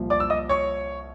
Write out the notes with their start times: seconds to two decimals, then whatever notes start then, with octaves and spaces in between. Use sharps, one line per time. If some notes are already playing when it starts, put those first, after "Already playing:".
Already playing: C2 A#2 F3
0.10 D5 D6
0.20 E6
0.30 D#5 D#6
0.49 C#5 C#6